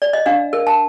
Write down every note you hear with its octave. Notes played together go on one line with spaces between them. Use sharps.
D5
D#5
D4 F5
A#4
A5